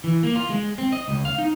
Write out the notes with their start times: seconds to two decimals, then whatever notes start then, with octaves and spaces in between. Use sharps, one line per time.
0.04 E3
0.23 A#3
0.35 F4
0.50 G#3
0.78 C4
0.92 D#5
1.08 C#2
1.25 F5
1.38 D#4